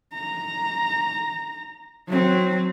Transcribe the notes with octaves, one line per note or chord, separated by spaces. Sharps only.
A#5
F#3 C4